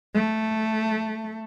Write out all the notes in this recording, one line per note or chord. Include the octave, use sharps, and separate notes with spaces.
A3